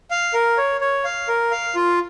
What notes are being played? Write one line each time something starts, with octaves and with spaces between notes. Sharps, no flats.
F5
A#4
C#5
C#5
F5
A#4
F5
F4